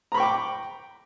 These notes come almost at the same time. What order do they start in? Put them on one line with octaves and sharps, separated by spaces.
A#5 B5 C#6 G5 D6